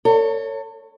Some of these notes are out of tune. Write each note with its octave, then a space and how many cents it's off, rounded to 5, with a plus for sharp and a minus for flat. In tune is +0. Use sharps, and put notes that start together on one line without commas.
A4 +40 C#5 +0